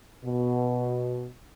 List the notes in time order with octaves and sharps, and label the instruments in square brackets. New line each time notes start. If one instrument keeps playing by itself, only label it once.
[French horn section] B2